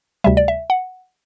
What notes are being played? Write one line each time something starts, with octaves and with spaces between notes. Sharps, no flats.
D2 C3 G3 E5
D5
E5
F#5